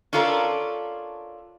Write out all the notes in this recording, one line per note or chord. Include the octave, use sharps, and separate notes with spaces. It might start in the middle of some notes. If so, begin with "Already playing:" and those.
C#4 D4 F4 A4 A#4